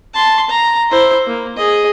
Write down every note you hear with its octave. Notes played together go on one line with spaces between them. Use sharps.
A5 C6
A#5
E4 C5
A#3
G#4 D#5